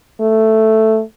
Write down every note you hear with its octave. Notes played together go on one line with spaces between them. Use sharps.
A3